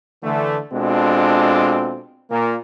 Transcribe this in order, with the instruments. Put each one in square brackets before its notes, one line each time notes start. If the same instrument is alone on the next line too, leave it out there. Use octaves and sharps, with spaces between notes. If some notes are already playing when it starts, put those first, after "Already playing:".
[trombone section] D3 E3 A3
B2 G#3 C4 D4 F4 A4
A#2 A#3